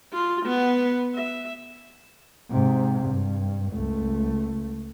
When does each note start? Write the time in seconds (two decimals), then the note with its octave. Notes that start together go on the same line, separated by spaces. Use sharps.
0.13 F4
0.46 B3
1.15 E5
2.51 G#2 C3
3.06 G2
3.73 C#2 A3